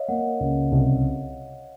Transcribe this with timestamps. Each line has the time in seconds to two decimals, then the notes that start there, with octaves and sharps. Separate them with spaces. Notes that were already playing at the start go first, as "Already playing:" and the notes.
Already playing: C#5 D#5 F5
0.08 A#3 F#5
0.40 C#2
0.72 C2